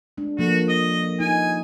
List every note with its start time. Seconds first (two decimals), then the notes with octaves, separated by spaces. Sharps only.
0.18 G#3 D4
0.39 F3 A#3 F#4 A4
0.69 D#5
1.20 D#4 G#5